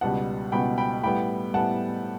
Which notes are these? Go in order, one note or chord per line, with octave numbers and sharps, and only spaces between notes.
C#2 B2 G3 B3 F#5 A5
C#2 B2 G3 B3 G5 B5
G5 B5
A2 G3 B3 G5 B5
A2 G3 B3 F#5 A5